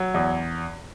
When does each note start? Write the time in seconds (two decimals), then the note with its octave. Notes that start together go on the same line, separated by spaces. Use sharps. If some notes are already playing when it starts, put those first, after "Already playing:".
Already playing: F#3
0.14 E2